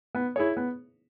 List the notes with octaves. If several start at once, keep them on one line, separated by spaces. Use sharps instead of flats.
B3
E4 G#4 C#5
B3